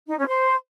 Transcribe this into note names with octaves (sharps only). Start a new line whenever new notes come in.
D#4
C#4
C5